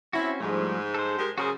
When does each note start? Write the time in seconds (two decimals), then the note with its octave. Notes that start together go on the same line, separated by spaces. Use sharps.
0.13 C4 C#4 E4 F#4
0.41 G#2 F3 G3 A3
0.94 A4 C5
1.19 G#3 G4 A#4
1.38 C#3 F#3 F#4 G#4 A#4 C5